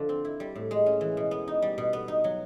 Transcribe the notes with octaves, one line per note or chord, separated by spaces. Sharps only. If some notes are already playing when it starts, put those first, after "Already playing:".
Already playing: D3 F3 D4
C4
E4
G3
A2
G#3
C#4
E3
B2
B3
D#4
G3
B2
B3
D#4
F#3